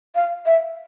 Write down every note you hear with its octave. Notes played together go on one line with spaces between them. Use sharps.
F5
E5